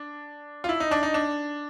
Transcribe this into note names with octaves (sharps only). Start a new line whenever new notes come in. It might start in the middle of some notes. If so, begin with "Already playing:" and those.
Already playing: D4
F4
E4
D#4
D4
D#4
D4